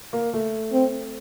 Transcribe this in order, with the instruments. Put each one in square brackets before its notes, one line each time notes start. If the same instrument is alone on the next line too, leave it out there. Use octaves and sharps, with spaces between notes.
[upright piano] A#3
A3
[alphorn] C4